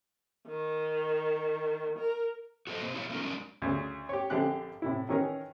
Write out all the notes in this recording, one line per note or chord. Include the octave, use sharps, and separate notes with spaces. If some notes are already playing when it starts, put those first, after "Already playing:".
D#3
A#4
F#4 A4 C5 D#5
A#3 C4 F#4 G4 C5
E4 G4 C#5 D#5 F5
A3 B3 C#4 D#4 F4 A#4
F#3 G#3 C#4 D4 A#4 D5
D2 C#3
G4 C#5
A#1 D3 C4 G4 G#4 F#6
A2 C3 E4
D#3 E3 C#4 G#4 A#4